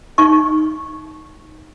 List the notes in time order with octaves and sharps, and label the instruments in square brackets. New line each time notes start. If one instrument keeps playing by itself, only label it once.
[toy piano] D#4 C#6